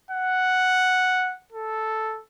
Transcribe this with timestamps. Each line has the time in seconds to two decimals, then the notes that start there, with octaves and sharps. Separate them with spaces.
0.11 F#5
1.52 A4